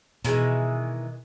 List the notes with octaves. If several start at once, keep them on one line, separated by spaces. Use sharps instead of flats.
B2 D#3 E3 G#3